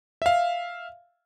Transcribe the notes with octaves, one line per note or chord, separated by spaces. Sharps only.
E5 F5